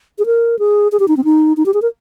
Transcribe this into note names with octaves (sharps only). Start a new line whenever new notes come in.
G#4
A#4
G#4
G#4
G4
D#4
C4
D#4
D#4
G4
G#4
A#4